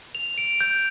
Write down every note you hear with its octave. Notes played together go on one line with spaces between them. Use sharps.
F7
D7
G6